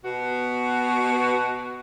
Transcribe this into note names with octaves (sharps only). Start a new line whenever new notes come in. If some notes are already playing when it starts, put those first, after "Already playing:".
B2 F#4